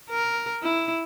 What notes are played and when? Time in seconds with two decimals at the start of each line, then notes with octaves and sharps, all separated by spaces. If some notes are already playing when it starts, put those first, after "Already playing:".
0.10 A#4
0.63 E4